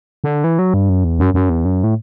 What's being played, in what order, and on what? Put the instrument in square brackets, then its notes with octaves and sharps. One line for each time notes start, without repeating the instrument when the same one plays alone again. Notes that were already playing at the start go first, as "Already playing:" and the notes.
[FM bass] D3
E3
F#3
G2
F#2
E2
F#2
F#2
E2
F#2
A2